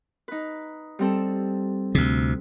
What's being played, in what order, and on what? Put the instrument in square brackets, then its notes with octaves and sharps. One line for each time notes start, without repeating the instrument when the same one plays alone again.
[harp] D#4 B4
G3 C4 A4
[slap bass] D2 C3